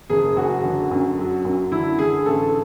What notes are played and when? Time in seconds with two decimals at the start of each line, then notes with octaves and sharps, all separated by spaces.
0.10 F#1 G#4
0.36 F#2 F#4
0.64 D3
0.91 F#2
1.18 F#3
1.45 F#2
1.72 D3 E4
1.99 D3 G#4
2.26 A1 A4